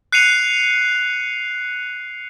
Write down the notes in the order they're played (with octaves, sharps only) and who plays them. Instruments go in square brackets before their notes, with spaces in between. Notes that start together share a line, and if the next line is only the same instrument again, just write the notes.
[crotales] F#6 C7 C#7 D#7 F7